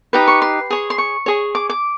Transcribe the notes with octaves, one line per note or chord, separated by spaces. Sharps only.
D#4 G4 B4 D6
C#6
C6
G#4 C#5
C6
C#6
G#4 C#5
D6
D6